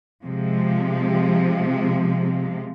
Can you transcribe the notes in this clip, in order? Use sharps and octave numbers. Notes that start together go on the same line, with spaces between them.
C3 F3 G#3